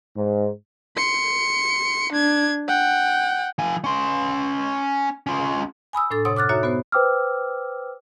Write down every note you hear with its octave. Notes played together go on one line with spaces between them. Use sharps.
G#2
C6 C#7
D4 G#6
F#5 G5
F3 G#5
C#4 C6
C#4 F4
G#5 B5 D#6 E6
A2 D4 A4 A6
F#2 C3 C#5 F#5 C6 D#6
D6 F6 F#6 A6
D#4 F#4 C#5 E5 A#5
B3 F#4 C5
B4 C5 G5 D6 E6 F6